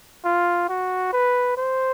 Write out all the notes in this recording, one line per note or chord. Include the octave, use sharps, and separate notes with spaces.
F4
F#4
B4
C5